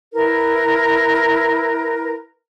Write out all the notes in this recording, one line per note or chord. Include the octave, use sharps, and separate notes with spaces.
E4 A#4 B4